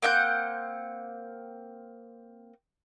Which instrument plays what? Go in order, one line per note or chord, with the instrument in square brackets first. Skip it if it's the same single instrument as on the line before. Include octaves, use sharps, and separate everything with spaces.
[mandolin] A#3 C4 F#5 G6